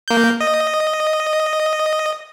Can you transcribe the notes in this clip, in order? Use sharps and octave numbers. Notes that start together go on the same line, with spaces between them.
A#3 G6
D#5